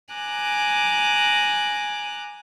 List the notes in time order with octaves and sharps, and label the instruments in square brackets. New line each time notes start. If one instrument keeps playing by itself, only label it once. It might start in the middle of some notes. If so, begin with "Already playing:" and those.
[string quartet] G#5 A#5 D6 F#6